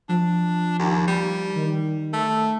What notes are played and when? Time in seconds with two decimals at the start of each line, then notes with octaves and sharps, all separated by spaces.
0.09 F3 D4
0.79 D#2
1.07 G3
1.56 D#3
2.13 A3